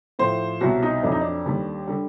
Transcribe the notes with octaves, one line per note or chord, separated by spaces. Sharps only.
A2 F3 C5
C2 B2 F#3 F#4
D#4
F2 D3 F#3 D4
D#4
D4
D#2 D3 G3
D3 G3